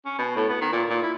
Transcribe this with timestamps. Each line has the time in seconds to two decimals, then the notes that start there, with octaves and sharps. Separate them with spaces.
0.06 C#4
0.18 B2
0.36 A2
0.49 B3
0.61 D#3
0.72 A#2
0.89 A#2
1.03 E4